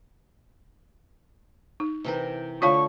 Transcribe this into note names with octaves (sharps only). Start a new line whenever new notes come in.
D#4
C3 E3 A#4
D3 A3 F4 C#5 F5 C#6